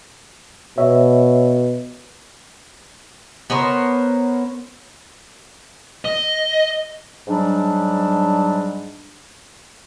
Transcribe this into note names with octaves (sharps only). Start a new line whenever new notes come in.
B2 C#5 E5
B3 A#4 C5 C#5
D#5
G#2 F#3 G3 D4